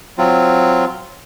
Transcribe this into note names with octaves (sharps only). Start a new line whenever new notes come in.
F#3 C4 F4